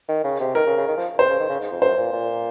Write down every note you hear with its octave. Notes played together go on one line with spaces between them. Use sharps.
D#3
C#3
C3
D#3 A#4
C#3
C#3
D#3
F3
C3 C5
C#3
D#3
C#3
G#2
F2
F#2 C5
A#2
A#2